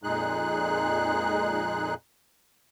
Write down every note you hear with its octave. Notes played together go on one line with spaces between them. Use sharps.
F2 A#2 G#3 D#4 G#4 F#6